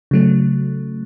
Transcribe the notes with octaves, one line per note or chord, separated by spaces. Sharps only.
C#3 F#3 A3